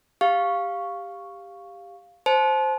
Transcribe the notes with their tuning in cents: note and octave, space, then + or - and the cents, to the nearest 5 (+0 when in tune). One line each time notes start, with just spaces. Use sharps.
G4 +15 F5 +0 C#6 +0
C5 +0 A5 -35